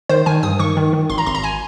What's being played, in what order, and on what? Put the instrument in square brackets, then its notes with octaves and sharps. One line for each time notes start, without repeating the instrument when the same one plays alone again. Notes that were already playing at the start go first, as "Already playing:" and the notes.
[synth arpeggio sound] D#3 C5
D#3 G#5
G2 D#6
D#3 C#6
D#3
D#3
G#1 C6
A#5
G#1 C6
A#5
G#5